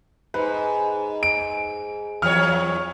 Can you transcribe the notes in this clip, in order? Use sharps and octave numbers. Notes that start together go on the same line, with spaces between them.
G#2 B4
D7
E2 F#3 C#5 F6